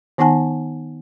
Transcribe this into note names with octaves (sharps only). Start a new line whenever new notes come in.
D#3 B3 D#4 F#5 G#5 A5